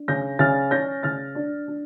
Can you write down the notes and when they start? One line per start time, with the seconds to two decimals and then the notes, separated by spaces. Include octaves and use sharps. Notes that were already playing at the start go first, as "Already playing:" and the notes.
Already playing: D4
0.08 C#3 G6 A#6
0.39 C#3 F6 A6
0.71 C#4 G6 A#6
1.03 C#3 F6 A6
1.35 D4
1.68 D4